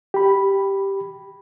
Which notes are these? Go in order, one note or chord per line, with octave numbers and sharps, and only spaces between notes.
G4 B5